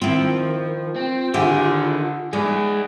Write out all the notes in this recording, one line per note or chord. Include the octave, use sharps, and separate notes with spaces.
D#3 F3 C4 E4
C4 F4
D3 D#3 E4 G4 G#4
G#3 D#4 G#4 D5